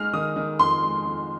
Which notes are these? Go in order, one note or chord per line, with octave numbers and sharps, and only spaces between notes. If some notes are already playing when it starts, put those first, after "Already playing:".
Already playing: G#3 D#4 F6
D#3 D#6
D#3
F2 C6
G#3
F2